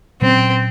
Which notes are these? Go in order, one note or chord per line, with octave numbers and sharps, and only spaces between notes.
A#2 F#3 C4 C#4